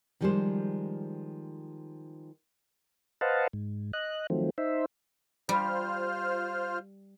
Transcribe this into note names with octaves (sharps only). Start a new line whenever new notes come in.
D#3 F3 G3 G#3 G4 C5
B4 C5 D#5 F5 F#5 A5
G#2
D#5 F#6
D#3 F3 F#3 A3 C4
D#4 C5 E5
G3 F4 C5 F6